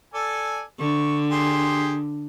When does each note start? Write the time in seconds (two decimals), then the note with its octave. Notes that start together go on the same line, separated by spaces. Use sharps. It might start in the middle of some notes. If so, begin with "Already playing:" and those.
0.14 A4 D5 G#5
0.79 D3 C#6
1.31 G4 G#4 C6